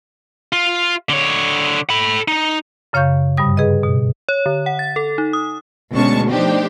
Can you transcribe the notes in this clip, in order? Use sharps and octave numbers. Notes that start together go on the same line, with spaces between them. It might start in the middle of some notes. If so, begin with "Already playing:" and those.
F4
D3 C#5
A4 B5
D#4
F#2 C#3 C#5 F5 C#6 G6
G2 C3 G3 D#6
G#4 B4 D#5
B2
C#5
D3
F#5
A6
A4
D#4
D#6
D2 B2 G#3 C#4 A5 C#6
F3 A3 D4 D#4 G4 C5